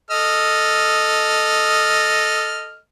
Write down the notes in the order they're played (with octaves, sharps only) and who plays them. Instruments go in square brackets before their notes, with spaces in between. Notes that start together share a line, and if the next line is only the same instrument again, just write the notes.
[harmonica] A4 D#5 F6